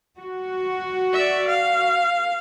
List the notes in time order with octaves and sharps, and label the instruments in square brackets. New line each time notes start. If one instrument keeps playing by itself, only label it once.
[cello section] F#4
[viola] D5 E5
F5